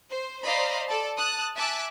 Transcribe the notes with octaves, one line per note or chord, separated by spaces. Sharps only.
C5
C5 D5 D#5 F5 A#5 B5
A4 D5 A5
A5 D#6 F#6
E5 G#5 A5 D6 E6 F#6